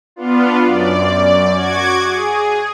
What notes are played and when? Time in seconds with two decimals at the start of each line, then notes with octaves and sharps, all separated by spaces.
0.16 B3 D4 F4
0.63 F#2 D5
1.54 F#4 D6 G#6
2.02 G#4